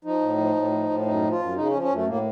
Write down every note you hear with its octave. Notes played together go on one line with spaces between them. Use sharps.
F3 D#4
A2
F3
A2
F3
A2
F#2 D#4
F3
F4
F#2
C#3 D#4
C#4
F3
C#4
F#2 A3
A2 A#3